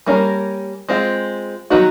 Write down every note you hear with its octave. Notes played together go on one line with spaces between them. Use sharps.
G3 A#3 C#4 F4 A#4
G#3 C4 F4
D#3 F#3 B3 D#4 F#4